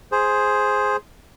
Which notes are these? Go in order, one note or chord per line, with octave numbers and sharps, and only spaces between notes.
G#4 C5